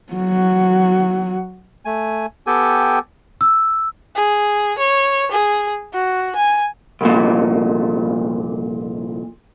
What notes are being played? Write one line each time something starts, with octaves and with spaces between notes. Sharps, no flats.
F#3 F#4
A3 G#5
B3 G4 A4 G5 G#5
E6
G#4
C#5
G#4
F#4
G#5
C2 F2 A#2